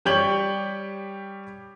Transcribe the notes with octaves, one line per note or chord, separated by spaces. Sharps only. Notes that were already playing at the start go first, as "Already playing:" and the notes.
G3 G4 C#5 G6 F#7